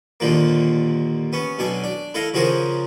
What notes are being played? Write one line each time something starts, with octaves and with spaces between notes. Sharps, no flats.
D#2 A#2 D3 F3 A#3
B3 C#4
B1 B2 D4 G#5
D4
E4 A4 D#5 F5
C#3 F3 F#4 G#4 A#4 C5